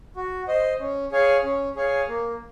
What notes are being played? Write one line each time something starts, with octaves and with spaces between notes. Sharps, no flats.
F#4
C5 D#5
C#4
G#4 C#5 F5 G#5
C#4
G#4 C#5 F5 G#5
A#3